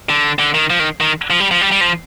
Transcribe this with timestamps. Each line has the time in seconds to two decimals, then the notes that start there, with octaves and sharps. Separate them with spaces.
0.09 D3
0.39 D3
0.54 D#3
0.70 F3
0.80 D#3
1.01 D#3
1.30 F3
1.40 G3
1.51 F3
1.61 G3
1.72 G3
1.81 F3